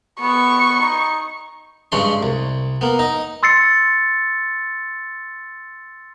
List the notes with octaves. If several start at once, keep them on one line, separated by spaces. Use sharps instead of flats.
B3 C#6
D#4
G2 C#3 G#3 C#5 C6
C2
A#3 B3
D#4 D#5
C6 E6 A6 C7 C#7